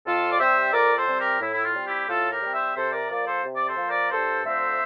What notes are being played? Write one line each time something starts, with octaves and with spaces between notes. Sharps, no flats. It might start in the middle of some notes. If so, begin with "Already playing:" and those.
F2 F4 A4
D5
C3 G3 C4 C5 E5
F2 A#4 D5
A4 C5
C3 G3 C4
G4 A#4
A2 E4
E4
F4
G3 C4
E4 G4
A2 F4 A4
G4 A#4
G3 C4
C5 E5
C3 A4 C5
A#4 D5
F3 A#3 A#4 D5
A4 C5
C3
D5
A4 C5
F3 A#3
A#4 D5
G2 A4 C5
D3 F3 A3 C4 C5 E5